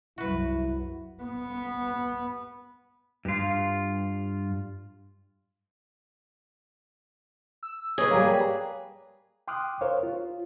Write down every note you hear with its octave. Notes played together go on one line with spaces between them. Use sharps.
C2 F#2 E4 F#4 B4
B3
G2 F4
E6
G#4 B4 C#5 D#5
G3 A#3
G5 C6 D6 D#6 F6 F#6
A#4 C5 C#5 F5
F4